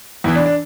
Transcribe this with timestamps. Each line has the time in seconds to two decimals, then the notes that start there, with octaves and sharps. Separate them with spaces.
0.24 E2 E4
0.28 E3
0.36 D4
0.46 D4